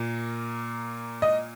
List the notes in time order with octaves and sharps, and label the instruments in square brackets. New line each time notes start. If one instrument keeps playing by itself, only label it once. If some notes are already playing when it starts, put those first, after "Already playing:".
Already playing: [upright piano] A#2 A#3
D#5